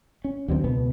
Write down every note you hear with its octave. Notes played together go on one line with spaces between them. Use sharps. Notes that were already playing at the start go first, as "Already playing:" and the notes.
C#4
D#2 D3 F#3 C4
C#2 B2 B3